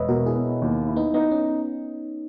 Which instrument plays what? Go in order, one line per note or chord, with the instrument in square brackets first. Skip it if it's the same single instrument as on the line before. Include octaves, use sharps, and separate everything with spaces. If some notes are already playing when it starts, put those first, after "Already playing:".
Already playing: [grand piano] E1 [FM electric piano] B4 C#5 D#5 E5
[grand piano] B2 [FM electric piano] F#4 A#4
[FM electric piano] E4 G#4
[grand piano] B3
D#2
E4
[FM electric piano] B3 D#4
[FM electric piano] B3 [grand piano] D#4
[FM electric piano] C#4